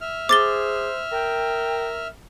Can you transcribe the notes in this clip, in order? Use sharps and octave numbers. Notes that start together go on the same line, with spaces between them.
E5 F6
G#4 C5 D6 A6 G7
A#4 G5